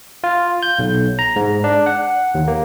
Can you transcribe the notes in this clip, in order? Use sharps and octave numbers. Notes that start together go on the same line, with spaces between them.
F4
G6
B1
A#5
G#2
D4
F#5
D#2
A#3